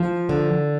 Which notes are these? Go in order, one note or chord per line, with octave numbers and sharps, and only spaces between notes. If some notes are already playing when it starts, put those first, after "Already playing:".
Already playing: F3
D3